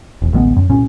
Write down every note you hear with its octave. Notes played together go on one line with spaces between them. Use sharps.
E1
A1 D2 G#3 B3
F#2
C2 A#2 C#4